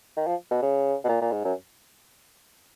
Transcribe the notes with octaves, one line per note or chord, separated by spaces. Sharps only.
D#3
F3
B2
C#3
B2
A#2
A#2
G#2
F#2